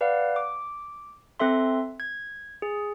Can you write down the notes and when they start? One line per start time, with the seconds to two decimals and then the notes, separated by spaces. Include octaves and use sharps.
0.01 B4 D5 F5 F#5
0.36 D6
1.40 C4 A4 E5 C6
2.00 G#6
2.62 G#4